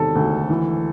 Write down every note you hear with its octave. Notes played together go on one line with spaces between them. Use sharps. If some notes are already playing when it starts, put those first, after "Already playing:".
Already playing: E1 C3 D#3 A4
D2
E3